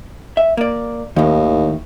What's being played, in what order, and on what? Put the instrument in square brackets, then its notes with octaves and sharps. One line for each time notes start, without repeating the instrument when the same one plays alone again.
[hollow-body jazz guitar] E5
A#3 D5
[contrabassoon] D#2 [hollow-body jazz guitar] A2 D#3